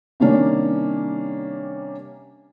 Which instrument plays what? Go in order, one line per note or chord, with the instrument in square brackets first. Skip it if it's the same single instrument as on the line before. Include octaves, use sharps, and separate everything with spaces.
[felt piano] C3 D#3 G3 A#3 C#4 D4